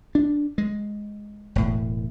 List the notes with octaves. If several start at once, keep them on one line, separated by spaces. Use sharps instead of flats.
D4
G#3
E1 A2